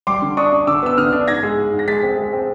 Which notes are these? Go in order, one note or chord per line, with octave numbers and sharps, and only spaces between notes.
G3 C6 D6
D3
D4 C#6 D#6
D4
D3 D6 E6
B3 E6
D3 D#6 F6
D4
G#2 G#6 A#6
G#3
G#2
G#2
A#6
G#3 A6 B6
C4
G#3
C4